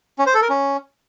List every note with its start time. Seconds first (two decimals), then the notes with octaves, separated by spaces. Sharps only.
0.19 C#4
0.27 C5
0.34 A4
0.42 A#4
0.50 C#4